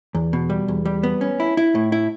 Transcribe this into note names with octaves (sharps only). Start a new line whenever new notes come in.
E2
B2
G3
E2
G3
B3
C#4
E4
E4
A2
E4